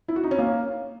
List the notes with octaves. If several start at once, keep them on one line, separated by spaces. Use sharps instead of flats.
E4
F#4
D#4
C#4
A#3